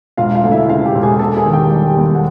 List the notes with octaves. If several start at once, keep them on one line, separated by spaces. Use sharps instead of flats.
E1 F4 F5
F4 F5
D2
E4 E5
C#3 F4 F5
G4 G5
E1
G#4 G#5
A#3 A4 A5
G#4 G#5
D#3
G4 G5
G3
G4 G5
D#2
F#5